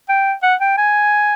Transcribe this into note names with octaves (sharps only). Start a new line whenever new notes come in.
G5
F#5
G5
G#5